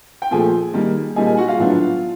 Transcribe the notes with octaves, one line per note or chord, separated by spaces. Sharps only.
G5
A#2 F3 A3 G#4 G#5
D#3 G3 A#3
A#2 G3 A#3 D#4 G#4 G#5
G#4 G#5
F#4 F#5
F4 F5
A2 F#3 B3 D4